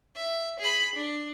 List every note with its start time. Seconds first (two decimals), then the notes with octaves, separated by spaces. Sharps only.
0.16 E5
0.59 G#4 B5
0.95 D4